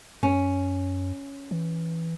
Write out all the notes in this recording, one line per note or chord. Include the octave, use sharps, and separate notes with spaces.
F#2 C#4
E3